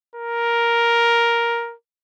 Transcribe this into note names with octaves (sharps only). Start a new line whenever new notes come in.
A#4